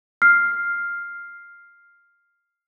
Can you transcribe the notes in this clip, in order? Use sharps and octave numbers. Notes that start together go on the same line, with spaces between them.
F6 C7